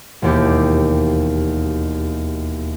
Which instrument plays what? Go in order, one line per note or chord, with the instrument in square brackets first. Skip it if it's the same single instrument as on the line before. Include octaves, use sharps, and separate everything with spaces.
[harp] E1 D#2 G4